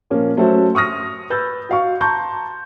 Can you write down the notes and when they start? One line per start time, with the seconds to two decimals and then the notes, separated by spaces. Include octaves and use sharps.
0.10 A#2 F3 A#3 C#4
0.37 F#3 A3 C#4 F#4 A4 C5
0.75 C#6 D#6 F6 A#6
1.30 B4 E6 G6 A6
1.69 F#4 F5 C#6
2.01 A5 A#5 C6 C#6 G6